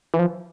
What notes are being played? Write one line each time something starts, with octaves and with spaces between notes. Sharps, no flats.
E3
F3